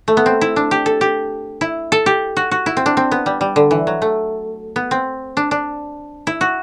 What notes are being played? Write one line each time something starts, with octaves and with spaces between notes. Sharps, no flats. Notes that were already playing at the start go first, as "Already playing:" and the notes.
A3
B3
C4
E4
D4
G4
A4
G4
E4
A4
G4
F#4
F#4
E4
C4
D4
C4
B3
G3
G3
D3
E3
F#3
A3
B3
C4
D4
D4
E4
F#4